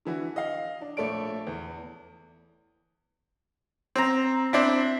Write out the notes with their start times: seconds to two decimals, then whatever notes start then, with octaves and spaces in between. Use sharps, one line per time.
0.05 D3 E3 E4 F#4
0.36 D#5 F5
0.81 D4
0.97 A#1 A3 A4 C#5 D5 D7
1.47 E2
3.96 C4 A#5
4.53 C4 D4 E4